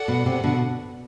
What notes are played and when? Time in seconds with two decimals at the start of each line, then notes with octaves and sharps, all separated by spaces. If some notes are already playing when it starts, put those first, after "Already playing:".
Already playing: F#4 A4 D5 F#5
0.08 B2
0.26 C3
0.44 B2 D3